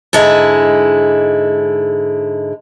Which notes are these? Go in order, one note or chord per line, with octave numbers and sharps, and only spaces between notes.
G#2 D3 G#3 E4